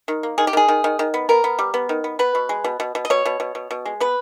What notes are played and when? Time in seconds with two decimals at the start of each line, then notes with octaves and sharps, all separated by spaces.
0.08 D#3
0.23 A#3
0.38 D#3 G#4
0.47 G4
0.53 D#3 G#4
0.68 D#3
0.84 D#3
0.99 D#3
1.14 B3
1.29 B3 A#4
1.44 B3
1.59 G3
1.74 B3
1.89 D#3
2.04 B3
2.19 B3 B4
2.35 B2
2.49 G#3
2.64 B2
2.80 B2
2.95 B2
3.05 D#5
3.10 B2 C#5
3.25 B2
3.40 B2
3.55 B2
3.71 B2
3.86 G#3
4.00 B3 B4